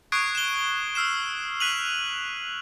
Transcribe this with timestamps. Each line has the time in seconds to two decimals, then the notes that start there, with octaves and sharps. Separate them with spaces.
0.12 C#6 D#6 F#6 G#6 C7 D7
0.35 E7 G7
0.95 E6 F6 C7 E7
1.60 F#6 B6 D#7 F7 F#7